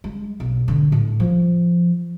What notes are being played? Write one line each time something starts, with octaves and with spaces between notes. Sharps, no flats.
G#3
B1
G#2 D3
A2
F3